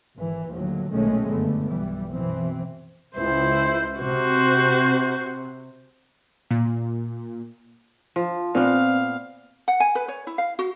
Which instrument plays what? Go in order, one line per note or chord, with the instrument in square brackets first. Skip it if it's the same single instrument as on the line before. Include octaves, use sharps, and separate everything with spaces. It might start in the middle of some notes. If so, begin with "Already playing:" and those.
[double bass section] G#1 E3
D#2 A2 D3 F3 F#3
B1 A#2 D#3 G#3 A3 C#4
F#1 G2 D3 A3 B3
B1 E3 G3
F#2 B2 E3 C4
[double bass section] C#2 [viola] E4 C5
[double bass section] C3 [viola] F#4 C5
[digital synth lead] A#2
[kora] F3
[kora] A#2 B3 [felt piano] C4 [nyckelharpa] F5
[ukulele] F#5
G#5
B4
C#5
E4
F5
F#4